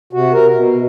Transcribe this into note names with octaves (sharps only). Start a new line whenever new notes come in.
C3 F#4
A#4
B2